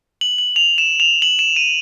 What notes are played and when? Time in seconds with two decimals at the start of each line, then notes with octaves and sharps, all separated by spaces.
0.21 F#7
0.38 F#7
0.56 F7
0.78 E7
1.00 F7
1.22 F#7
1.39 E7
1.56 D#7